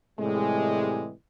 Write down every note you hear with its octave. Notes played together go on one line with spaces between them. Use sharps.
A2 C3 E3 G3 G#3